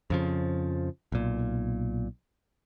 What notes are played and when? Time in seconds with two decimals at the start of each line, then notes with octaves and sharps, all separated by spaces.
0.10 F2 C#3 F3
1.12 B1 A#2